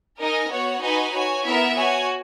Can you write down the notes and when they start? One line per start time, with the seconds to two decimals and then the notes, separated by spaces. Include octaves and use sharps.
0.19 D#4 A#4 D#5 G#5
0.51 B3 F#4 C#5 F#5
0.82 D#4 F#4 B4 D#5 G#5
1.14 F#4 C#5 G#5
1.45 B3 E4 A#4 E5
1.75 F#4 C#5 G#5